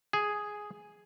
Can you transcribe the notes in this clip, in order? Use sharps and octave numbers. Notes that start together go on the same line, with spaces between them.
G#4